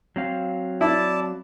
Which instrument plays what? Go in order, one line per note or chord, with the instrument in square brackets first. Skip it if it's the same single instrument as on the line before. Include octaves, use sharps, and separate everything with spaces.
[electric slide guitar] F#3 C4 F5
[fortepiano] E4 [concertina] D5 A5